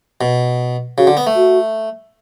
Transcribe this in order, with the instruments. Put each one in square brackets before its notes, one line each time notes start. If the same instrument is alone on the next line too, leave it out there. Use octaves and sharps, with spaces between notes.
[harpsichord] B2
[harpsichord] C#3 [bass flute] F#4
[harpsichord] D3
B3
A3
[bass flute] F#4